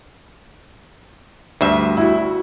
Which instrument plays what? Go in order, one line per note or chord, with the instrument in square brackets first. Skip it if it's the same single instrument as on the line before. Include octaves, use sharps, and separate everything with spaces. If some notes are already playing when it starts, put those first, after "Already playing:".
[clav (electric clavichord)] D2 G2 E5
[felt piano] E4 F#4